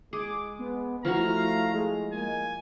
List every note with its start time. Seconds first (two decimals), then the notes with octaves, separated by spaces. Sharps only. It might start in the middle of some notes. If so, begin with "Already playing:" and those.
0.13 G#3 G#4 D6
0.59 B3
1.05 F3 A3 E4 F#4 A#5 F6
1.34 F5
1.73 G#3
2.12 A#3 G#5